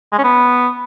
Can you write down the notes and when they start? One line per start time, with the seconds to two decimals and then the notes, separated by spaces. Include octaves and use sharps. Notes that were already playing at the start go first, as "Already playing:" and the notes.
0.13 G#3
0.18 C#4
0.24 B3